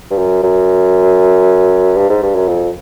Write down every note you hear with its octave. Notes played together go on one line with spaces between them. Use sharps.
G2
F#2
F#2
G2
G#2
G2
F#2
F2